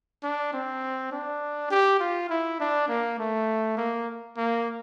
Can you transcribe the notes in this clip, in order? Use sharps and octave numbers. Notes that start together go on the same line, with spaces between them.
D4
C4
D4
G4
F4
E4
D4
A#3
A3
A#3
A#3